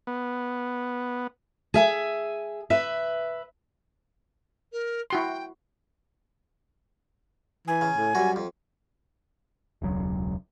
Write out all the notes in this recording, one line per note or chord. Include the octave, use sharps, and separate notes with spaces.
B3
G#4 E5 G#5
B4 E5
A#4
E4 F#4 G5 C6
E3 G#5
C#3
A2
F#2 G3 F#4
F2
E1 C#2 F#3